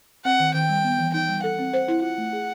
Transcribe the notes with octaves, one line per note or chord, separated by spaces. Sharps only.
C4 F#5
D#3
D#3 G5
G3
B3
E3
D#4 G5
G3
A4 F#5
C4
C5
E4
F4 F#5
A3
G#4